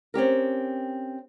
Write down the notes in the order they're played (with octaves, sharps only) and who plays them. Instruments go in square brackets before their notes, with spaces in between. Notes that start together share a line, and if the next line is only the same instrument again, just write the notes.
[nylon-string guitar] C4 C#4 G4 A#4